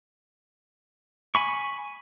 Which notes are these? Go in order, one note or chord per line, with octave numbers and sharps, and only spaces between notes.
G#5 B5 C#6